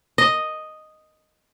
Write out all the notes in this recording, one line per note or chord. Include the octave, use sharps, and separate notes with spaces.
D#5